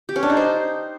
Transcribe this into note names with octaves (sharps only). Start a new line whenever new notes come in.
G4
C#4
D4
D#4
C5